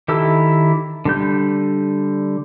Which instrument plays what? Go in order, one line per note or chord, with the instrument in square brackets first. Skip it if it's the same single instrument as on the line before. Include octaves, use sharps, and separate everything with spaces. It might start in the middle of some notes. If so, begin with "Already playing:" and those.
[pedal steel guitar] D#3 E4 G4 A4 E6
D3 G3 G6